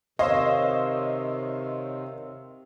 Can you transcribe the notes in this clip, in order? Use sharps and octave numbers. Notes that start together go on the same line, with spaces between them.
C3 D#3 C5 C#5 D#5 F5 C6 E6